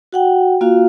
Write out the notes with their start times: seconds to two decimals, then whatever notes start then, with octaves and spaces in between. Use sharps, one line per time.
0.12 F#4 F#5 G5
0.61 A#3 F4 F#4 F5